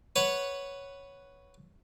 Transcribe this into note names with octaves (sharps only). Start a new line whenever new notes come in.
B4 C#5 F#5